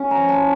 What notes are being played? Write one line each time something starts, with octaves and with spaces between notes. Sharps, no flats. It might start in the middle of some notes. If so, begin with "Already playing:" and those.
Already playing: C#4
A#5
F3
A5